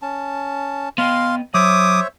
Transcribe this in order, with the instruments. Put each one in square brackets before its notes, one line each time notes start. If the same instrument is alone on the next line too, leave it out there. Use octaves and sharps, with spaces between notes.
[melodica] C#4 A5
[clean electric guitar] B3 D#5 G5 [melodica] F5 C6
[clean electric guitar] F#3 [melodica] C5 C#5 E5 [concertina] D6 D#6